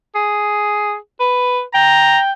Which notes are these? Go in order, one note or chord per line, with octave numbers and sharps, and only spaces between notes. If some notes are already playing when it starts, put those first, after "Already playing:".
G#4
B4
G5 A#5